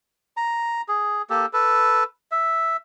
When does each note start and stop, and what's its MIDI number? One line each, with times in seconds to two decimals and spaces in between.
0.37 0.82 82
0.89 1.22 68
1.30 1.46 58
1.30 1.46 67
1.30 1.46 69
1.53 2.04 69
1.53 2.04 71
2.31 2.77 76